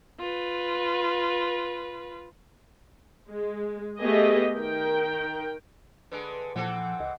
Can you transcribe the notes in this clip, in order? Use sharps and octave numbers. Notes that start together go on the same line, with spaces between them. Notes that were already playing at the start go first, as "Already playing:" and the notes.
F4 B4
G#3
A3 B3 G4 G#4 D#5
D#3 A#4 G5
D3 G#3 B4
A#2 E3 F3 C4 A4 F#5
C#2 D#5